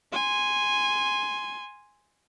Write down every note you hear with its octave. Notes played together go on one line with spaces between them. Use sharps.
G#5 C6